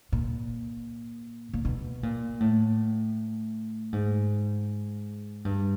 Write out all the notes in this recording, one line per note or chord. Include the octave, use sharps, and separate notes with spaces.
A#2
A#2
B2
A#2
A2
G#2
G2